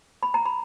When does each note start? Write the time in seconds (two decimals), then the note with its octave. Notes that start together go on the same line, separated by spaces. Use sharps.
0.23 B5
0.34 A#5
0.46 B5